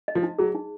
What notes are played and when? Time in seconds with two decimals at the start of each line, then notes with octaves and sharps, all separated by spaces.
0.08 D#5
0.15 F3
0.23 D#4
0.38 F#3 G#4
0.55 D#4